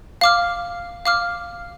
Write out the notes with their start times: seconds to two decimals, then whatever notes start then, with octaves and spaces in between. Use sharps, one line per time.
0.21 F5 D6 F6
1.06 F5 D6 F6